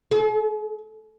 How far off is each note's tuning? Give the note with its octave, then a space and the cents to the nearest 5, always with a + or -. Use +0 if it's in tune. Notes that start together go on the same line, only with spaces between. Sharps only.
G#4 +45